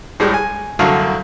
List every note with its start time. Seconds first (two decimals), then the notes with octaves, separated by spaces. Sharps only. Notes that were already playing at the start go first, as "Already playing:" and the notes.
0.20 A2 G3 G#3
0.34 G#5
0.79 C2 F#2 D3 A3 F#4 F5